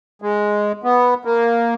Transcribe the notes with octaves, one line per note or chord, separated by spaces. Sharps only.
G#3
B3
A#3